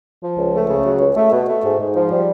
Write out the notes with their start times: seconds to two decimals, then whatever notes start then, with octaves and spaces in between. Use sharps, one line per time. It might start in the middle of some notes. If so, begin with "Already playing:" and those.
0.22 F3
0.38 C#2
0.54 A3
0.69 C#3
0.85 F#3
1.00 C#2
1.16 A3
1.32 B2
1.48 A3
1.64 G#2
1.79 G#2
1.95 F3
2.11 G3